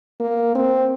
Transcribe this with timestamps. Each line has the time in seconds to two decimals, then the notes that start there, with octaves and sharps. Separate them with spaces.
0.20 A#3
0.55 C4